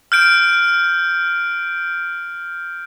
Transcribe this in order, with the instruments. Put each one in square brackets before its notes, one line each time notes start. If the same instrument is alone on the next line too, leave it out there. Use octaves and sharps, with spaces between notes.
[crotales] F6 G6 D7